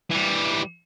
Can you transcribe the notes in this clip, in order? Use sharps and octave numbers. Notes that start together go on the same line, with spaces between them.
E3 G3